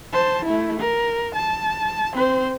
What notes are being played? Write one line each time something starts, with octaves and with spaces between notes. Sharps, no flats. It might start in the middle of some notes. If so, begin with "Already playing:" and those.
C5 A5
A3 E4
A#4
A5
C4 C5